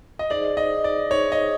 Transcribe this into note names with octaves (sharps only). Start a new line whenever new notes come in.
D#5
D#4 G#4 C5 D5
D#5
D5
D#4 G#4 C5 C#5
D#5